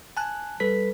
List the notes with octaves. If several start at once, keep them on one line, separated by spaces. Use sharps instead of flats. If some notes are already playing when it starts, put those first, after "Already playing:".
G#5 A5 F#6
G3 A4 B4 B6